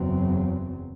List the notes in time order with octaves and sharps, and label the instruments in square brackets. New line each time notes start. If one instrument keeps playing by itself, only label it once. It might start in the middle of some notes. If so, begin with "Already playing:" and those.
Already playing: [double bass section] F#1 E2 C#3 F#3 C4